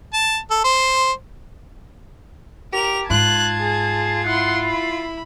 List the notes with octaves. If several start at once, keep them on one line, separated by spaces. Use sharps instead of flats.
A5
A4
C5
G4 A#4 F7
G#2 F4 A5 F#6 G#6
G#4
E4 F#5 C6
B5